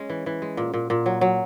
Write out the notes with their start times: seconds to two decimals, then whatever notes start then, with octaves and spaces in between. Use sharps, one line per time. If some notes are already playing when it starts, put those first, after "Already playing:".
Already playing: G#3 C#4
0.10 E3
0.26 E3
0.42 G#3
0.57 A#2
0.74 A#2
0.90 A#2
1.06 F#3
1.21 F#3